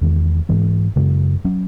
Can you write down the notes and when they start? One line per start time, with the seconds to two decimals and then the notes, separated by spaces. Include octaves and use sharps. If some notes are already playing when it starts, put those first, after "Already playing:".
0.01 E2 D#3 G#3
0.49 G#2 E3 G#3 C#4
0.96 F#2 C#3 G#3
1.45 F#3 C#4